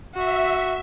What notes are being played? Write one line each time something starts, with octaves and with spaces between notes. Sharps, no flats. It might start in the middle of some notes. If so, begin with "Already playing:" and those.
F#4 E5